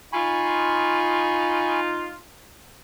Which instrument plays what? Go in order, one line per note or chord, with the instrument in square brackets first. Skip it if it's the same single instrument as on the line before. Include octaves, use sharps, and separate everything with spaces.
[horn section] D#4 F4 [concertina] G#5 B5 C#6